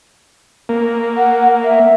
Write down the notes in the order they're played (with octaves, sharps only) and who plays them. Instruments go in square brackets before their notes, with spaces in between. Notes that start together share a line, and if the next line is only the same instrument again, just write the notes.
[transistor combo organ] A#3
[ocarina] F#5
E5